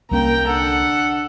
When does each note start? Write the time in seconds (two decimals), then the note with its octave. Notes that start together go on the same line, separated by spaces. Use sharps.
0.11 C2 A#3 C#4 G5 A#5
0.48 D3 A4 F#5